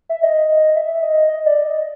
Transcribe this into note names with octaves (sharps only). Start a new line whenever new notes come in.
E5
D#5
E5
D#5
D#5
D5
D#5